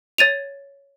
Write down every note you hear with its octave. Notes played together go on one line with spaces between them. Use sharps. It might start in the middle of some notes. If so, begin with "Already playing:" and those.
C#5 A6 D#7 F7